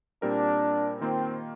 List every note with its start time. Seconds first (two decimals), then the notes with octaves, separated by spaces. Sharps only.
0.22 A#2 G3 C4 D4 G4 A#4
1.01 D#3 A#3 C4 F4